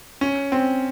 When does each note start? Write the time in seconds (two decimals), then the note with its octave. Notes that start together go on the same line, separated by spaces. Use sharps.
0.21 C#4
0.52 C4